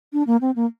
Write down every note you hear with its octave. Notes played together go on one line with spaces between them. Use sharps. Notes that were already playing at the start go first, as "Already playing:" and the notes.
D4
A#3
C4
A#3